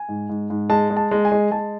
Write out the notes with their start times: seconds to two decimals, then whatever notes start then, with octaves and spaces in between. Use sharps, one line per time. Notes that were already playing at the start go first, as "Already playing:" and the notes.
Already playing: G#5
0.09 G#2
0.29 G#2
0.50 G#2
0.70 G#3 A5
0.90 G#3
0.97 A5
1.11 G#3
1.25 G#5
1.32 G#3
1.51 G#3 A5